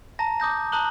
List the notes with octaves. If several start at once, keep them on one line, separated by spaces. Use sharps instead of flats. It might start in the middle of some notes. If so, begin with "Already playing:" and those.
A5 A#5 A#6
D6 D#6 G6 A#6
A5 A#5 D#6 F#6 F#7 G7